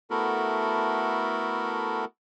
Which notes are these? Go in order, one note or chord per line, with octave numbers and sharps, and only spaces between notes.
A3 B3 E4 F#4 A4 A#4